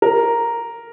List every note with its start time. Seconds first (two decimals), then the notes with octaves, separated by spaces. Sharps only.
0.02 A#4